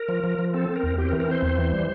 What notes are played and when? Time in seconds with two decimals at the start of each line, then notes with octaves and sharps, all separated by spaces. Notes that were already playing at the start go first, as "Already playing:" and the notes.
Already playing: A#4
0.09 F3
0.24 F3
0.39 F3
0.54 C4 A4
0.69 C4
0.76 A#4
0.83 E2
0.98 C4 G4
1.09 A#4
1.12 E3
1.20 A#4
1.28 C4 C5
1.42 E2
1.58 E3
1.73 G3